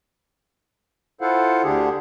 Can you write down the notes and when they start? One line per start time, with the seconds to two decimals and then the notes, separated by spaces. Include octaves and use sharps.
1.21 E4 F4 A4 C5 F5 F#5
1.63 D2 D3 D4 G4 G#4